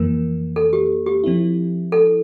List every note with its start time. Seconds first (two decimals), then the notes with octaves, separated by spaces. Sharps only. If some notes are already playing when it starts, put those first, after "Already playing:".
Already playing: F2 E3 A#3 A#4
0.56 A4
0.73 G4
1.06 G4
1.24 F3 C4 E4
1.92 A4